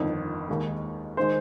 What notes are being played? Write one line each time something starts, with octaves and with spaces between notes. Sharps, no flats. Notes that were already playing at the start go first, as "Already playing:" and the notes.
Already playing: G1 F2 D#3
D#2 D#3 G#3
D#3 G#3 C5